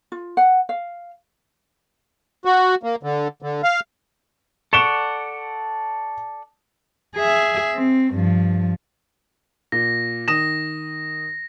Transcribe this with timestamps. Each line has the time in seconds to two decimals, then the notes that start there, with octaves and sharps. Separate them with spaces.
0.12 F4
0.37 F#5
0.69 F5
2.45 F#4
2.83 A#3
3.03 D3
3.42 D3
3.63 F5
4.73 A4 D5 F#5 C#6 E7 G7
7.15 G#4 E5
7.74 C4
8.14 G2 F3
9.72 A#2 A#6
10.28 D#3 D#6 A#6 E7